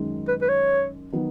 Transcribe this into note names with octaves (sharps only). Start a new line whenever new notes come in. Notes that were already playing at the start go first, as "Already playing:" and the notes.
Already playing: F#2 D#3 G#3
B4
B4
C#5
D#3 F#3 B3